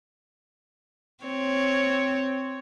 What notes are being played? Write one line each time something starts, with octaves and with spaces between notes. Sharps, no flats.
C4 C#5